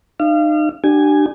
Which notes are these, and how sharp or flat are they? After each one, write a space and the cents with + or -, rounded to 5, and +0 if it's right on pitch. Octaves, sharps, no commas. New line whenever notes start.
D#4 -35 F5 -30
D4 +25 G4 -35 G#5 +0